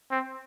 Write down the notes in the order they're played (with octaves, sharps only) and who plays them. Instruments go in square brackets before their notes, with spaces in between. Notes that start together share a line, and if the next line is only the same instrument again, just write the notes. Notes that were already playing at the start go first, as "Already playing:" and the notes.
[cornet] C4